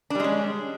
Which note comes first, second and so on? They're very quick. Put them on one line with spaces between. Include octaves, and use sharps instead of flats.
D4 G3 G#3 C#4